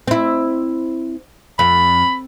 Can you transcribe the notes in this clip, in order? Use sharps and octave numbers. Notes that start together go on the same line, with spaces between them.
C4 E4
F2 B5